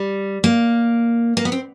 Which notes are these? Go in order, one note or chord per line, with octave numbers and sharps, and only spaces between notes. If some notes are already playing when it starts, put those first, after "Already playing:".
Already playing: G3
A#3
A#3
B3
C4